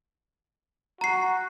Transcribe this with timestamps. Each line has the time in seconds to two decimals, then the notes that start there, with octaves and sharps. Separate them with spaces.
1.01 F#4 A#5 C7